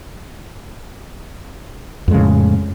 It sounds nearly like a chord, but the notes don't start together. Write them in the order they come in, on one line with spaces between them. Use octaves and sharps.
F2 G#3 C#3 A2